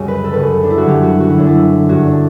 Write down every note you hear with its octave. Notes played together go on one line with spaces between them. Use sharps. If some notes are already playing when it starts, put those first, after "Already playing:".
Already playing: C#2 F#2 C#3 G3
B4
A4
F#2 C#3 G3 B4
D4
E4
F#4
F#2 D3 F#3 G4
F#4
F#4
E4
F#2 D3 F#3 D4
E4
G2 F#3 F#4
D4